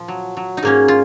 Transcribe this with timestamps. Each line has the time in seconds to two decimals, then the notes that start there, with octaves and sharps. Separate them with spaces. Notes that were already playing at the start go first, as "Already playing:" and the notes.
Already playing: A#2 F3
0.08 F#3
0.37 F#3
0.57 D#4
0.63 G#2 A#3 C#4
0.88 F4